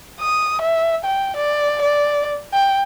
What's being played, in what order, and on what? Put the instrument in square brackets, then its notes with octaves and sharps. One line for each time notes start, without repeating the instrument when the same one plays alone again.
[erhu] D#6
E5
G5
D5
D5
G5